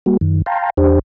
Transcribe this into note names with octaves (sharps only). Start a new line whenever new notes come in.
G3 A#3 F#4
F#2 D#3
F5 G5 A5 A#5 C6
E2 D4 G4 C5